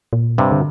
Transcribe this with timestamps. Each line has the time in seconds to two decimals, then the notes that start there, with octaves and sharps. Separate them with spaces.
0.13 A#2
0.38 G2 C3
0.52 D3